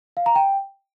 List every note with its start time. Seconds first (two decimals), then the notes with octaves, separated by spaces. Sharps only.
0.17 F5
0.26 A#5
0.36 G5